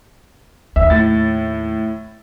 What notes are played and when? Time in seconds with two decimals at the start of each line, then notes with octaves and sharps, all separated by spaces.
0.76 D#2 E5
0.90 A2 A6